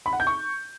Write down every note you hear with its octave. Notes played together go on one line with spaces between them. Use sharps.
B5
F#5
G6
C#6